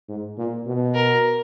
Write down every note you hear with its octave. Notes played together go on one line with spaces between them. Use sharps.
G#2
A#2
B2
A#4